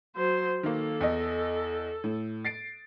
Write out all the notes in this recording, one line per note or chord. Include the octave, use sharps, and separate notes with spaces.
F#3 C5
D#3 A#3 A4
E2 D#5
A2
A6 C7 D7